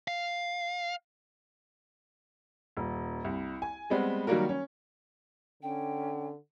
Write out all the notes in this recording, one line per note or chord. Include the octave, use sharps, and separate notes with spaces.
F5
D#1
C2
G#5
G3 G#3 B3 C4
D#3 F#3 G3 A#3 F#4 A#4
C#4
D3 C#4 G5